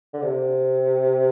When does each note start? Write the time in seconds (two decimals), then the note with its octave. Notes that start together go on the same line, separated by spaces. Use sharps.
0.14 D3
0.22 C3